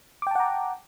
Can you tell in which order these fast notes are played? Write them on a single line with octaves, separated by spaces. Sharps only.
D6 G5 A5 F#5 A#5